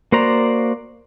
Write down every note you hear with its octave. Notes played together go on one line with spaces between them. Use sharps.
A#3 F#4 C5 D5 A#5